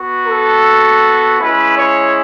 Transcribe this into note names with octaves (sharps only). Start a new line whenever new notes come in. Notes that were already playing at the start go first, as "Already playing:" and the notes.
Already playing: B3 F#4
A4
G#3 C#4 E4 B4
C#5